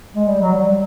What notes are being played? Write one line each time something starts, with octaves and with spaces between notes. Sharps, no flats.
G#3
G3
F#3
G3